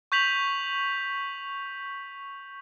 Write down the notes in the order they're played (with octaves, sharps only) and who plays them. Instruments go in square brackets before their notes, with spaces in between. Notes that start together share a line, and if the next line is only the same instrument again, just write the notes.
[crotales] C#6 G6 B6 F7 F#7